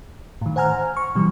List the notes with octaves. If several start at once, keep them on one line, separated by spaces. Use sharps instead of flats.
A2 D#3
C5 F#5 G#5 A#5 F6
C#6
B2 E3 G3